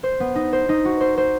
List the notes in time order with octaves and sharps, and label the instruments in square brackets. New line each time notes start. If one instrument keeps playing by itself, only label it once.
[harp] C5
B3
D#4
C5
D#4
F#4
C5
C5